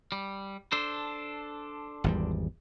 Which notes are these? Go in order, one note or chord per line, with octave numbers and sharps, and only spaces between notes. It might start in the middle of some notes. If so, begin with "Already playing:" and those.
G3
D4 A4 C5
G#1 E2 G3